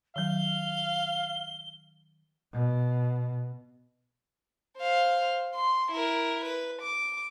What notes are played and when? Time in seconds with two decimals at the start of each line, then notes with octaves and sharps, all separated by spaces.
0.16 D#3 F#3 F5 G7
2.52 B2
4.78 C5 F5
5.55 C6
5.92 E4 A#4
6.45 B4
6.82 D6